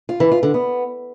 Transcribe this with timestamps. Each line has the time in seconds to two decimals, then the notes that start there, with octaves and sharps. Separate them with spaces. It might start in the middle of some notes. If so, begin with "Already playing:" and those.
0.09 F4
0.20 E3
0.31 F4
0.43 D3
0.54 B3